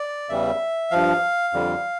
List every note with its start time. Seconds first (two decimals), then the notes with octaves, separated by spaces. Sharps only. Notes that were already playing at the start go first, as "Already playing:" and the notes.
Already playing: D5
0.29 E2 C#3 E3 G3 E5
0.91 G2 F3 F5
1.53 F2 D3 G3